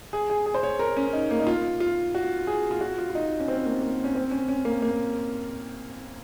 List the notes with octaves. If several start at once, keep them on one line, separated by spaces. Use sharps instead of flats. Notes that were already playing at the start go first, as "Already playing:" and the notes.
G#4
G#4
G#4
C5
C#5
A#4
C#4
D#4
A#3
D#4
F4
F4
F#4
G#4
F4
F#4
F4
F4
D#4
C#4
C4
A#3
A#3
C#4
C4
C#4
C#4
A#3
A#3